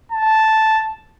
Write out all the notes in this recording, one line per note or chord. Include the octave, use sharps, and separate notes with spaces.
A5